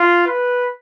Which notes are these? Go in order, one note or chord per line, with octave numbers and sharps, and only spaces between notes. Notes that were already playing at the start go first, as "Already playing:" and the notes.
Already playing: F4
B4